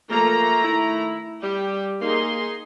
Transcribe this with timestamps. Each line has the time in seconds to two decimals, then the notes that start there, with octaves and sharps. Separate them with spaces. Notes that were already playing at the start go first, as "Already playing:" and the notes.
0.10 F3 A3 A#3 A#5
0.63 D#3 E4
1.43 G3 G4
2.01 A#3 D#4 G#4 C6